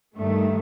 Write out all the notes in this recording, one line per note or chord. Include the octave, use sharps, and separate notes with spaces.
G2 D#3 A3